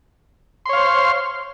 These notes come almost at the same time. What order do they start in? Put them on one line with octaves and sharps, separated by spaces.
C6 C#5 F5 C5